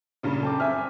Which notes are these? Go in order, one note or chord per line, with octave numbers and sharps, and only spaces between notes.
G2 A#2 C#3
F#2 A4 G5 D6
C4 E5 G#5 F6